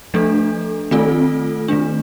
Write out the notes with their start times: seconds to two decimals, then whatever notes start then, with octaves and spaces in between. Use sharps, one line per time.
0.14 F3 A3 D4 A4
0.91 D#3 A3 C4 F4 A4
1.68 D#3 A3 D4